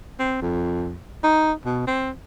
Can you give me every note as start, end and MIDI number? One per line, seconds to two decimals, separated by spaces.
0.19 0.37 60
0.41 0.95 41
1.23 1.52 63
1.65 1.84 47
1.87 2.10 60